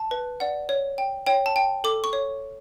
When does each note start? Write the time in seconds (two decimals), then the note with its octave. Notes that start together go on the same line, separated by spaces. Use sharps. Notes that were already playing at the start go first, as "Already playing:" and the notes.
Already playing: A5
0.11 B4
0.40 D5 F#5
0.69 C#5
0.98 G5
1.26 C#5 G5
1.46 A5
1.56 G5
1.84 A4 D6
2.04 C#6
2.13 C#5